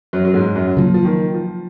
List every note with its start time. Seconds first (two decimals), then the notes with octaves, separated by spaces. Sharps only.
0.13 F#2 F#3
0.25 F#3
0.34 G#2 G#3
0.55 F#2 F#3
0.77 C#3 F3 F#3 A#3
0.94 F3
1.05 D#3
1.34 F3